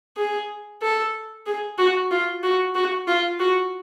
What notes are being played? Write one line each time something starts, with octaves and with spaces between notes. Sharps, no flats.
G#4
A4
G#4
F#4
F4
F#4
F#4
F4
F#4